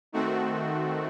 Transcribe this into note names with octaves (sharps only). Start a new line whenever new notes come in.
D#3 A3 C4 F#4